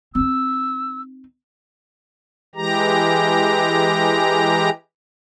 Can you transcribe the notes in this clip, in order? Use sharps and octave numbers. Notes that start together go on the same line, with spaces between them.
C4 D#4 E6
E3 G#3 G4 A#5